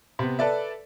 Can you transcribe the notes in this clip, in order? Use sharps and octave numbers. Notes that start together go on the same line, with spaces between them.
C3 B3
A4 B4 D5 E5